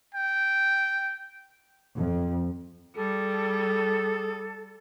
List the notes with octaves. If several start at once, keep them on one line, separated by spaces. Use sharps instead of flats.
G5
F2
G3 G#4 A4